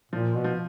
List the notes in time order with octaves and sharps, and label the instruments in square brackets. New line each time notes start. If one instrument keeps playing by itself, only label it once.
[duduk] A#2 [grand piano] F3
[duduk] B2
[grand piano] F3